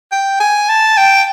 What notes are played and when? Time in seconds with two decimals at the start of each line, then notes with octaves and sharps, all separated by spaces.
0.12 G5
0.40 G#5
0.69 A5
0.97 G5